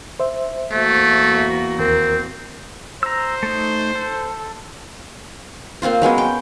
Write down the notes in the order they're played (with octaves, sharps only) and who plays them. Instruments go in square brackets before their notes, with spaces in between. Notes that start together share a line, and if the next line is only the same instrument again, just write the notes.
[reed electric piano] C5 E5
[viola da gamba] E2 A#3 F#4 [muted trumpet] A3
[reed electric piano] D#2 A#4 [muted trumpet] C4
[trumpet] C5 [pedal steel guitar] A#5 E6
[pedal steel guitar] A3 D#4
A4
[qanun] A#3 C4 F4 C5
F#3 G#3 B3 C#4
G5